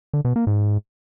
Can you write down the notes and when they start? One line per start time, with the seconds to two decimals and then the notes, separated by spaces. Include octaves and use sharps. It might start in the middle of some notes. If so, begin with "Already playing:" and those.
0.13 D3
0.25 B2
0.36 A#3
0.47 G#2